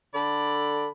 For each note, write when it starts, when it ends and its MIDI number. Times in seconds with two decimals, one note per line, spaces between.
0.15 0.88 50
0.15 0.88 69
0.15 0.88 74
0.15 0.88 83